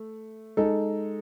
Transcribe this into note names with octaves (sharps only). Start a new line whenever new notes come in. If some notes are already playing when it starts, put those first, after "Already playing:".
Already playing: A3
G#3 D#4 A4